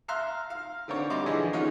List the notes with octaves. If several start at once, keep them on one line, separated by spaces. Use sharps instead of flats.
E5 F5 A#5 C6 F6 F#6
F5
D3 C4 A#4 C#5 D5
G3 D4 D#5 C6 D6
D3 E3 F3 G#4 D#5 G#5
D#3 B3 C#4 D#4 F4 G#4